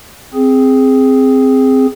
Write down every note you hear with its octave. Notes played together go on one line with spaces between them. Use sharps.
C4 G#4